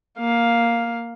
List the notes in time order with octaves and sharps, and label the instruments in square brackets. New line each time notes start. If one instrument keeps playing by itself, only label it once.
[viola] A#3 F5